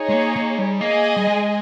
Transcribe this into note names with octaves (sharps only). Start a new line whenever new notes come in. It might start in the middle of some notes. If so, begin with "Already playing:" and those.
Already playing: D#4 G#4 C#5
G#3
A#3
A#3
G3
A#3 G#4 D#5 G#5
G3
G#3